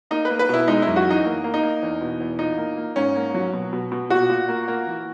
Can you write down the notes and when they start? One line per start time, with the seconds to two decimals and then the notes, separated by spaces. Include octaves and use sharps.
0.11 A#3 D#4
0.25 B4
0.30 A#3
0.39 B4
0.49 B2 E4
0.68 G#3 D#4
0.82 F#2 E4
0.96 F#4
1.06 E3 D#4
1.25 A#3
1.44 A#3
1.54 D#4
1.63 A#3
1.82 E2
2.01 B2
2.20 E2
2.39 A#2 D#4
2.58 A#3
2.77 A#3
2.96 G#2 C#4
3.16 A#3
3.34 F#3
3.53 B2
3.73 B2
3.92 B2
4.10 A#2 F#4
4.30 A#2
4.48 A#3
4.68 A#3
4.87 E3